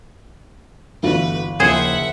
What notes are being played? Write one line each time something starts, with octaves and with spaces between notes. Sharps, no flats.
G1 E3 A3 F4 F#4 B4
D#2 C#3 F3 E4 G#4 C5 E5 F#5